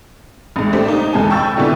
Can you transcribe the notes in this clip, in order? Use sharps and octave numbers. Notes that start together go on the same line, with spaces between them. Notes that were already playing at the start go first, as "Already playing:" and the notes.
A1 G#2
A3 D4 G4 C5 D5
A#3 D#4
E2 G#2 G#3 A4 G#5 A5
G5 B5 C#6 E6 G6 A6
A#2 D3 D#3 G3 B3 E4